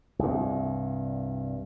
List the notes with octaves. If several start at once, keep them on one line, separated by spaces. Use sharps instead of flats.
C2 G2